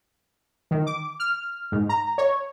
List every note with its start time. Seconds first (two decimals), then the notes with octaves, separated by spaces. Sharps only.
0.71 D#3
0.87 D6
1.20 F6
1.72 G#2
1.89 A#5
2.18 C#5